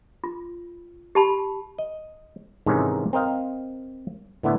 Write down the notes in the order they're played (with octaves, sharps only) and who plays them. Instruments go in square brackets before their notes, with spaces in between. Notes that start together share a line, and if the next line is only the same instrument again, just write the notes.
[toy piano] F4
G4 A5 B5
[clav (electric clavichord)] D#5
G#2 C3 D#3 E3 C#4 D#4
C4 A#4 D#5 F5
A2 D3 B3 E4